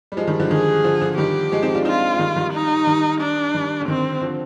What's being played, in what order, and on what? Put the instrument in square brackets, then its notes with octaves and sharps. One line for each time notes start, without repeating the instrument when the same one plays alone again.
[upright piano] G3
F3 G#3
D#3 G3
D3 F3
[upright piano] D#3 [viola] G#4
[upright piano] D3 F3
D3 F3
[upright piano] D#3 G3 [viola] G4
[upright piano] F3 G#3
C4 D#4
D4 F4
[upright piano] C4 D#4 [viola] F4
[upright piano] G#3
D#3 G3
D#3 G3
[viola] D#4
[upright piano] D#3 G3
[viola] D4
[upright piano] D#3 G3
D3
[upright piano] D#3 [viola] C4
[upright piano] D3 F3